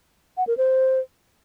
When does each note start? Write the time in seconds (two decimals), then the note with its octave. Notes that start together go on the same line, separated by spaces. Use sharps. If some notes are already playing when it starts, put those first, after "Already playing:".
0.37 F#5
0.47 A#4
0.57 C5